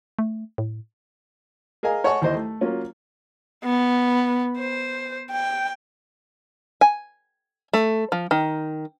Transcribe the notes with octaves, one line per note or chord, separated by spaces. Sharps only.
A3
A2
G#4 A#4 D#5 F5 G#5
C#5 D#5 F#5 G#5 A5 C#6
D#2 E4 C5 D#5
A3
F#3 A#3 C#4 F4
B3
C5
G5
G#5
A3
F3
D#3